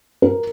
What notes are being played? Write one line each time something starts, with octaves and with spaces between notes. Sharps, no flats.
A#4